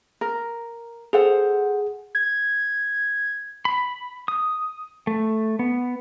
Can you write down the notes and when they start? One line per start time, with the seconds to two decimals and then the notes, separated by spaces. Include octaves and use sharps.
0.21 A#4
1.13 G#4 A4 C5 F#5
2.15 G#6
3.65 B5
4.28 D#6
5.07 A3
5.59 B3